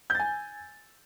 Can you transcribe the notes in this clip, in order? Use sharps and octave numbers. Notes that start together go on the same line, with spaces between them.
G#5 G6 A6